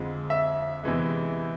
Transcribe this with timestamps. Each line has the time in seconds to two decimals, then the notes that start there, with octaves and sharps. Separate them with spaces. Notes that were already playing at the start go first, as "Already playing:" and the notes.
Already playing: F2 D3 G#3
0.30 E5
0.83 E2 C3 E3 G#3